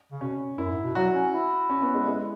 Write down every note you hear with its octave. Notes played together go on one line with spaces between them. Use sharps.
C#3
B2 C#4
F#2 E4
G#2
B2
F#3 F#4
C#4
E4
C#4
B3
G#3
G#3